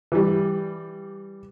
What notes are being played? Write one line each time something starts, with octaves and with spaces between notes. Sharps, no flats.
E3 G3